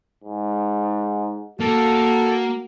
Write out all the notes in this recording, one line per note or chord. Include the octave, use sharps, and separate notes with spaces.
G#2
A#3 F#4 A4